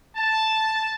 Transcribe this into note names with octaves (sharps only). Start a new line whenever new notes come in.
A5